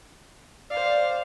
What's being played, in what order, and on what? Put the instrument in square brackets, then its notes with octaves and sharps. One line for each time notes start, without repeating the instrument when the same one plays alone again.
[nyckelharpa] C5 F5 [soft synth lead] D5